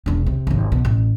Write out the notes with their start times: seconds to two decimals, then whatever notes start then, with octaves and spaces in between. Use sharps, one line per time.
0.06 E1 D4
0.26 C3
0.47 G#1 D#2
0.72 B2
0.85 A1